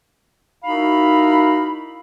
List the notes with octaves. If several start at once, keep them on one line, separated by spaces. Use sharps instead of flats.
D#4 E4 F#4 A#4 F5 B5